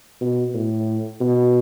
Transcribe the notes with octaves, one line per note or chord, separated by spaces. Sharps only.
B2
A2
B2